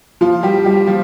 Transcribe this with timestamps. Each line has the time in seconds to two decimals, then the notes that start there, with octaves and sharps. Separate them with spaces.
0.21 F3 F4
0.43 G3 G4
0.64 G3 G4
0.87 F3 F4